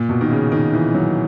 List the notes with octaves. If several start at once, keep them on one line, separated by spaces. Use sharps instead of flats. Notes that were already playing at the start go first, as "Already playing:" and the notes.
Already playing: A#2
B2
D#3
C#3
D#3
E3
F#3